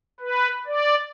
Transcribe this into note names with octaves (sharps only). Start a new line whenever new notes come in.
B4
D5